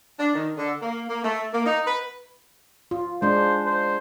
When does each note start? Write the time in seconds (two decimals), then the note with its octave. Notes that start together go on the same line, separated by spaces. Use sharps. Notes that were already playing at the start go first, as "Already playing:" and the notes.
0.19 D4
0.34 D#3
0.57 D3
0.82 A#3
1.09 A#3
1.24 A3
1.53 A#3
1.66 D#4
1.87 B4
2.91 F4
3.22 G#3 D4 C5
3.66 C5